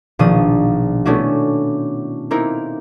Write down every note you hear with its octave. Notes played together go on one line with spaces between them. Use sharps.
A#1 B2 D#3 F3 D4 D#6
A3 B3 C#4 D4 E4 F#4
A#3 C4 D#4 E4 A#4